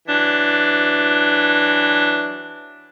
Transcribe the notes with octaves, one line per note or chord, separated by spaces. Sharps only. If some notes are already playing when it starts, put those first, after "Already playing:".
E3 F#3 D4